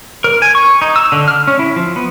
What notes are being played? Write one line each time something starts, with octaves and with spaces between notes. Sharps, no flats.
A#4
G#5
C#6
D#4
E6
D3
F6
C#4
E4
F3
B3